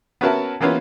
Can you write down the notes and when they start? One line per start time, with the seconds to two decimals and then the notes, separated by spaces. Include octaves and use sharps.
0.21 B3 C#4 F#4 A#4 E5 A5
0.61 E3 A#3 B3 C#4 F4